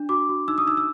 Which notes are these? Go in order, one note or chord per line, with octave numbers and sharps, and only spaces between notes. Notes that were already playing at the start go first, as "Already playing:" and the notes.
Already playing: D4
F#4 D6
F#4
D#4 E6
D#6
D#4 E6
E6